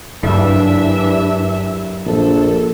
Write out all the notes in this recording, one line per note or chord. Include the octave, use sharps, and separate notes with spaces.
F#1 G2 E3 D4 E5
A#1 A4